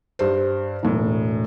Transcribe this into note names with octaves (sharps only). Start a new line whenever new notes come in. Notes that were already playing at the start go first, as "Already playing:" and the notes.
G2 C5
E1 A2